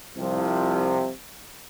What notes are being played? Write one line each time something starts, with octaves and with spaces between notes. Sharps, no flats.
C2 C3 F3